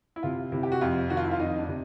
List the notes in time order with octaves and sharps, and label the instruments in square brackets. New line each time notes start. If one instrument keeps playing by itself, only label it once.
[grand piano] E4
C3 F4
C3 E4
G4
F#4
F2 F4
D#3 F#4
F4
E4
F4
F2 D#4
D4
C3